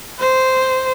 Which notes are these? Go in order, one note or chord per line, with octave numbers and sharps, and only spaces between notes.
C5